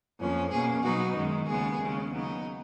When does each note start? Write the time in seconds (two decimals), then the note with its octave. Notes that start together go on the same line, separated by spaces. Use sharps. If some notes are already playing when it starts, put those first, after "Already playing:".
0.19 F2 F3 A#3 C#4
0.51 B2 A#3 C#4 G#4
0.83 B2 F#3 B3 D#4 F#4
1.15 F#2 D#3 G#3
1.47 D#2 C#3 G#3 B3 G#4
1.79 D#2 C#3 G#3 C#4
2.11 C#3 F#3 B3 D#4